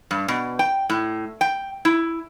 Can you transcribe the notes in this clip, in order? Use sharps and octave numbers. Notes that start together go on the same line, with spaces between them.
G2
B2
G5
A2
G5
E4